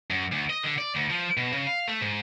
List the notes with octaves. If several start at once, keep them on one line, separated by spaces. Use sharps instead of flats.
F#2
D2
D#5
D3
D5
D2
F3
B2
C#3
F5
A3
G#2